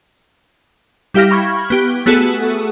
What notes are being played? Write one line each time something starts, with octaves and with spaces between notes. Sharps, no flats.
G3 E4 G4 F5 F6 A#6
B5 C#6 F6 G#6
B3 G4
A3 B3 F#4 G#4 A4